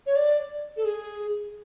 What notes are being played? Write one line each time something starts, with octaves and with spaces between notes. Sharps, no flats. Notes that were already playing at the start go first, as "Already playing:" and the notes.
C#5
D5
A4
G#4